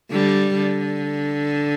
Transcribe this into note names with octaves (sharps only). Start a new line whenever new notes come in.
D3 G3
D3